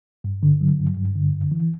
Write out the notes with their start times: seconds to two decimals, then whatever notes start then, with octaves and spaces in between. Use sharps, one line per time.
0.24 G2
0.43 D3
0.61 F#3
0.79 G2
0.97 G2
1.16 D3
1.33 F#2
1.52 E3